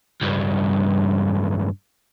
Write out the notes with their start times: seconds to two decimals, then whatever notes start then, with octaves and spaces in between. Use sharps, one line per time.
0.22 C#2 G2